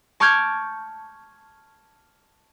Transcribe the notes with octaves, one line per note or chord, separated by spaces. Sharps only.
A5 C#6 D6 F6 G6 G#6